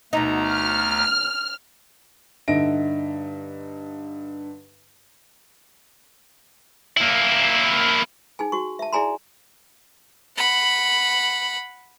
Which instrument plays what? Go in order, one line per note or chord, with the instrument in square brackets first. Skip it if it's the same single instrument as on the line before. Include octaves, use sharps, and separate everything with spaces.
[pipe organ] D2 A3 A#5 [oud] B2 D#4
[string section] F6
[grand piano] G2 D3 D#4 E5 A#6 D7
[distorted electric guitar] A#3 E4
[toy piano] D#4 G#4 G#5
F#4 C#6
E5 A5
E4 G#4 D5 G#5 A#5 C6
[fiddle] F#5 B5